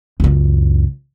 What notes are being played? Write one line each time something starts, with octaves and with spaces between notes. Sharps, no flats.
C#2 F#2